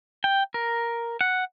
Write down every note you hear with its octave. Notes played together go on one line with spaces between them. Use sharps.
G5
A#4
F#5